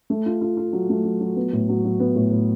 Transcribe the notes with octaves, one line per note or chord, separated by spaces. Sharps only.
A3
F4
F4
F4
F#3
A3
F#3
F#3
B3
A2
F#3
F#3
B3
A2
A2